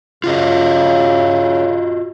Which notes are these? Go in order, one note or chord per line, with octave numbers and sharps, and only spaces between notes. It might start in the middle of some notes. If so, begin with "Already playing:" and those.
C#3 F4 F#4 D#5